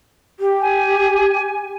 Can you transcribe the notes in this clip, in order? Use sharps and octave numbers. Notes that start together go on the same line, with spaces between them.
G4
G#5